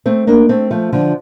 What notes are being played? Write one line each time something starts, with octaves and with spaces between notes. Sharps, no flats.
A3 C4
A#3 D4
A3 C4
F3 A3
D3 F3